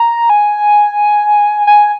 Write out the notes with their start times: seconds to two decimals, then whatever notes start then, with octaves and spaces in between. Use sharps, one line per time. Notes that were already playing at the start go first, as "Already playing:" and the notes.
Already playing: A#5
0.30 G#5
1.67 G#5